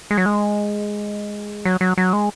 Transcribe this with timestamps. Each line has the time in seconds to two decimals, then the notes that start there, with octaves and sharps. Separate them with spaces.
0.11 G#3
0.18 F#3
0.26 G#3
1.65 F#3
1.81 F#3
1.98 F#3
2.13 G#3